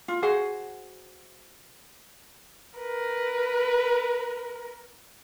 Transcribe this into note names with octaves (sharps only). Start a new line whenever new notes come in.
F4
F#4 G#4 C5 F#5
A#4 B4